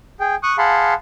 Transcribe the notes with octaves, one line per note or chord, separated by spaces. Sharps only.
G#4 G5
C#6 D#6 F#6
G#4 F5 F#5 A5 B5 C6